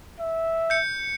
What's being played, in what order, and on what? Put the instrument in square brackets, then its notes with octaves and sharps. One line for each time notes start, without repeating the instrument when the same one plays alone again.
[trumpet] E5
[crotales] G6 C#7